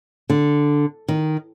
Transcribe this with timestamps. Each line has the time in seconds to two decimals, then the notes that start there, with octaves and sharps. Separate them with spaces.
0.30 D3
1.08 D#3